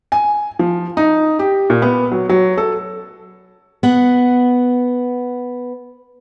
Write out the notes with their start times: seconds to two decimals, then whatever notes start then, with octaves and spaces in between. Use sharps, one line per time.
0.12 G#5
0.59 F3
0.97 D#4
1.39 G4
1.70 A#2
1.82 B3
2.12 F#3
2.29 F#3
2.57 A4
3.83 B3 F#5